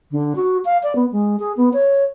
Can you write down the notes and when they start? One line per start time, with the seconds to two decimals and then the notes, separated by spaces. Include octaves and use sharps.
0.11 D3
0.36 F#4
0.65 F5
0.83 D5
0.95 B3
1.12 G#3
1.39 G#4
1.57 B3
1.73 C#5